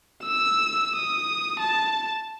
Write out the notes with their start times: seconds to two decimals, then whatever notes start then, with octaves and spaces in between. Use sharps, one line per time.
0.23 E6
0.96 D#6
1.60 A5